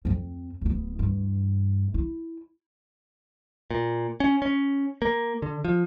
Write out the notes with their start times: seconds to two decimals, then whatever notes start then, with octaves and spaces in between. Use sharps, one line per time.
0.05 F2 C4
0.61 D1 B3
0.99 G2 E3
1.94 E4
3.71 A#2
4.20 C#4
4.42 C#4
5.02 A#3
5.42 D3
5.65 F3